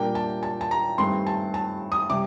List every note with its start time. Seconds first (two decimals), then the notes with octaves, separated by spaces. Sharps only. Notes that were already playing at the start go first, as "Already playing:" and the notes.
Already playing: A#2 G3 A#3 D4 G5
0.15 A5
0.43 A5
0.61 A5
0.71 A#5
0.98 G2 D#3 A3 C4 C6
1.27 A5
1.54 A5
1.92 D#6
2.10 C3 G3 D6